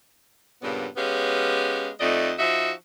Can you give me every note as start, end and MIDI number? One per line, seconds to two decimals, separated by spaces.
0.62 0.87 43
0.62 0.87 46
0.62 0.87 49
0.62 0.87 59
0.97 1.89 56
0.97 1.89 59
0.97 1.89 61
0.97 1.89 67
0.97 1.89 77
2.00 2.32 41
2.00 2.32 57
2.00 2.32 63
2.00 2.32 74
2.00 2.32 75
2.39 2.72 53
2.39 2.72 63
2.39 2.72 66
2.39 2.72 76